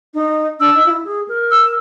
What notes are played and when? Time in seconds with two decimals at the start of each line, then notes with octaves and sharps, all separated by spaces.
0.14 D#4
0.60 D4 E6
0.75 D#4
0.86 F4
0.90 E4
1.05 G#4
1.28 A#4
1.51 E6